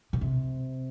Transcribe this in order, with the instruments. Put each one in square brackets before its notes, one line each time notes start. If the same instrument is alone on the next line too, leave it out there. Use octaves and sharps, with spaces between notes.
[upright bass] B2
C3